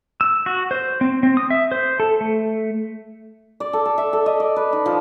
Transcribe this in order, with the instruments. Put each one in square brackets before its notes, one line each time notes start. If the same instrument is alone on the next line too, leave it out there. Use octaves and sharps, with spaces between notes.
[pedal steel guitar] E6
F#4
C5
C4
C4
D#6
E5
C5
A4
A3
[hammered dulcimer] D5
A4
A4
E5
A4
D#5
D5
B4
D#4
F3